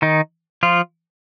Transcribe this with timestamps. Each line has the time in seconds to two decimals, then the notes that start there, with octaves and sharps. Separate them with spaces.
0.02 D#3 D#4
0.63 F3 F4